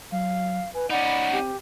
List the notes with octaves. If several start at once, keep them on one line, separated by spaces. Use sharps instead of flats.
F#3 F5
B4 G#5
C#4 D#4 D5 F#5 B5
C4 G4